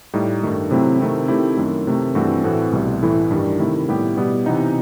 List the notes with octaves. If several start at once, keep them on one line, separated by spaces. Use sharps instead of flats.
A2 G3 D#4
G2 D#3 A3
C3 F#3 A3 C4 E4
C3 D#3 A3 C4 E4
D#3 A3 C4 E4 G4
F#2 D#3 A3
C3 D#3 A3
G2 E3 A3 C4 F#4
A2 E3 A3 C4 F#4
C2 B2 G3
A2 E3 A3 E4
G2 D#3 G3
C3 D#3 A3 E4
A2 G3 B3 E4 G4
B2 G3 B3 E4 G4
C3 E3 B3 D#4